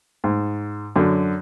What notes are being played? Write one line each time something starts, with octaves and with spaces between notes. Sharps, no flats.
G#2
F#2 D3